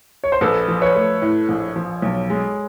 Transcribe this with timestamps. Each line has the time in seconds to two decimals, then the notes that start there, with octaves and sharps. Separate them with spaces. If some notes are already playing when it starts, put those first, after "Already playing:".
0.24 C#5
0.32 C5
0.41 A#1 A4 B4
0.68 F3
0.82 B4 C#5
0.95 A3
1.22 A2
1.49 A#1
1.76 F3
2.02 B1
2.30 G#3